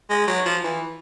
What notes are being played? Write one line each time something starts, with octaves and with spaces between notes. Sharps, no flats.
G#3
F#3
F3
E3